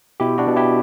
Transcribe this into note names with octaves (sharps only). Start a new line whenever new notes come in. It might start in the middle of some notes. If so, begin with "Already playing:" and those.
B2 E4 G4
D4 F#4
B2
E4 G4